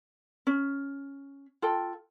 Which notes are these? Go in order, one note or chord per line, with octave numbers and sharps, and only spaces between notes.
C#4
F4 A4 G5